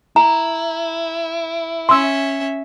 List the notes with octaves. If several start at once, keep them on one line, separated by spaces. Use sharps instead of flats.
E4 A#5
C#4 E5 C6 E6